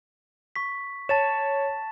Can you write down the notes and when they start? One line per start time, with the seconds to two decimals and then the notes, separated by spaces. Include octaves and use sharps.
0.56 C#6 B6
1.09 C#5 A5 A6 E7